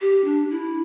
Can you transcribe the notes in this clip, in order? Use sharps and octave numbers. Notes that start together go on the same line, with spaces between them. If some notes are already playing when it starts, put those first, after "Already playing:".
G4
D4
E4